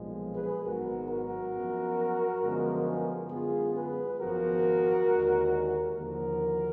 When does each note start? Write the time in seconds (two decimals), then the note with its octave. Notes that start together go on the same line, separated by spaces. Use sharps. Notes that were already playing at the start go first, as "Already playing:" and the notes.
Already playing: B1 A#2 F3 G#3
0.36 G#4 B4
0.64 G#1 G#2 F#3 B3 F#4 A#4
1.09 F#4 A#4
1.54 F#2 F3 B3
2.42 F#2 D3 F3 G#3 B3
3.30 F#2 D3 G#3 B3 F4 G#4
3.75 G#4 B4
4.20 G#1 F#2 F3 B3 F#4 A#4
5.08 D#2 D3 G#3
5.97 D#2 D3 F3 A#3 F#4 A#4